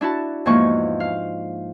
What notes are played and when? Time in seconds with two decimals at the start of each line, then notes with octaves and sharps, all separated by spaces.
0.01 D4 E4 F#4 A5
0.46 E2 G#2 F3 A#3 C#6
1.00 F5